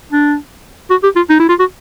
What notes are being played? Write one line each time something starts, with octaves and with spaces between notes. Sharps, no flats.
D4
F#4
G4
F4
D#4
E4
F4
F#4